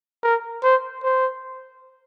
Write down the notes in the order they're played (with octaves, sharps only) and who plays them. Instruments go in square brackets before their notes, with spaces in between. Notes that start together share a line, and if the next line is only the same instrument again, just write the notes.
[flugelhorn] A#4
C5
C5